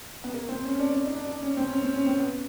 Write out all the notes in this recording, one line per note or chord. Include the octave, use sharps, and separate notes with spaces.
B3
A#3
C4
C#4
C#4
D4
D4
D#4
D4
D4
C#4
C4
C#4
C4
C#4
C4
B3